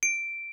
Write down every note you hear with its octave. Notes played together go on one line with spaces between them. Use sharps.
D7